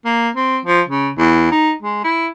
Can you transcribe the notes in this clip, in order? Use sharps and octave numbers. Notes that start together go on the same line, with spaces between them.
A#3
C4
F3
C#3
E2
D#4
G#3
E4